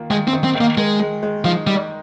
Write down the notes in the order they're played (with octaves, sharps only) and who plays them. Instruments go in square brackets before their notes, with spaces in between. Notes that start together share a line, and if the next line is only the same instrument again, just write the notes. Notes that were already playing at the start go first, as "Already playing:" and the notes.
Already playing: [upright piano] D#3 A#3 F4
[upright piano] D#3 [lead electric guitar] G#3
[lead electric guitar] C4
[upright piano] D#3
[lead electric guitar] C4
[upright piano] D#3
[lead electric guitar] A#3
[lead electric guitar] G#3 [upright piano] A#4
[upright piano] G#3
G#3
[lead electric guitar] F3 [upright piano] D#4
[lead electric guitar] G3 [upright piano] D#4